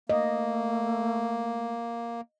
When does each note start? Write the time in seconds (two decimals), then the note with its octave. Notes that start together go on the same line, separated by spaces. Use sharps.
0.10 A3 A#3 D#5